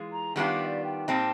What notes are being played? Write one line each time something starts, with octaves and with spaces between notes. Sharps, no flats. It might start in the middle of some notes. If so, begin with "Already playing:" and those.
Already playing: E3 G#3 F4
A#5
D#3 G3 B3 D4 F4 F#5
F#5
D5
G5
A#2 G3 C4 D#4 A5